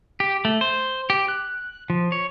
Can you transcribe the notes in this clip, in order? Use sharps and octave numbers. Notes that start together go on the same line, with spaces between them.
G4
A3
C5
G4
F#6
F3
C#5